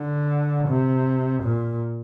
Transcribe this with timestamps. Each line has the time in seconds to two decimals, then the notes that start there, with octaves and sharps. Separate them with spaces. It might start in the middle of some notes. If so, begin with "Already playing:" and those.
Already playing: D3
0.68 C3
1.43 A#2